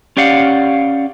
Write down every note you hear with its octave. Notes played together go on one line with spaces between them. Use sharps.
C#4 G4 D5 F5 F#5